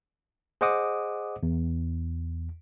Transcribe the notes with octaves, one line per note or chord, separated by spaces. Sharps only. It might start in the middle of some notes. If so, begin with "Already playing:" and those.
G#4 C5 D#5 F#5 D6 D#6
E2